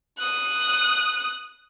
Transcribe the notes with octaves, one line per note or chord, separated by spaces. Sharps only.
D#6 F#6